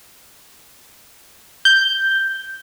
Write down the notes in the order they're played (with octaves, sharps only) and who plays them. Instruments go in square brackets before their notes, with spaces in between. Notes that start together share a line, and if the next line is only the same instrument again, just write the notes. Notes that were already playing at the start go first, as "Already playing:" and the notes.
[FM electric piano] G6